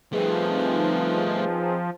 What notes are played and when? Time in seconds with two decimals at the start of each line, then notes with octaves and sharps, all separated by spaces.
0.13 F3 G3 A3 C4 D#4 G#4 B4